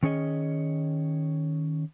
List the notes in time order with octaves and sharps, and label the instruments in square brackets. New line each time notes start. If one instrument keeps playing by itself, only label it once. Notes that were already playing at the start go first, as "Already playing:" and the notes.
[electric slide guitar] D#3 C#4 G#4 C#5 D#5